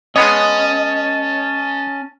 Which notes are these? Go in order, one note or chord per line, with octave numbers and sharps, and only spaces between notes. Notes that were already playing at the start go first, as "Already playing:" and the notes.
G#3 B3 C#4 C#5 D#5 G#5 A5